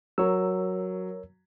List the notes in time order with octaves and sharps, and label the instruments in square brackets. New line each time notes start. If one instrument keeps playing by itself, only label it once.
[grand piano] F#3 [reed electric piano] A#4 C#5 E6